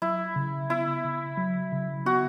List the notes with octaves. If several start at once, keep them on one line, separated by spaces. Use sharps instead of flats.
F#3 E4
C#3
B3 E4
C#3
F#3
C#3
B3 F#4